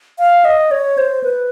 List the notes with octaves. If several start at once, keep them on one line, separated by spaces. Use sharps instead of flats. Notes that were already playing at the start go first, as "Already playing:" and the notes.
F5
D#5
C#5
C5
B4